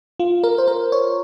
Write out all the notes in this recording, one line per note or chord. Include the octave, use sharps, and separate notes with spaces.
F4
A#4
C5
A#4
C#5